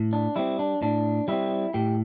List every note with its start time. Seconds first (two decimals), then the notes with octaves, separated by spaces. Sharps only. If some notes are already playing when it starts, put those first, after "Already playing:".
Already playing: A2
0.13 D4
0.36 G3 C4 E4
0.59 D4
0.82 A2 D4
1.28 G3 C4 E4
1.74 A2 G4